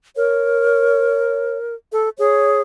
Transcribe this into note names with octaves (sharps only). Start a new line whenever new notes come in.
A#4 C#5
A4
G#4 C#5